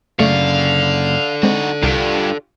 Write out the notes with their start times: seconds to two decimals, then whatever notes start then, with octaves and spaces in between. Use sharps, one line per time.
0.19 F#2 C#3 A3 A4 D5 F5 C#6
1.43 G#3 C4 D#4 F#4
1.83 C2 G2 F4 G4